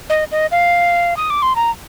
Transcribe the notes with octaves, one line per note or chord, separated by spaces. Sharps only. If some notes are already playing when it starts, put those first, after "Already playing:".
D#5
D#5
F5
D#6
D6
C6
A#5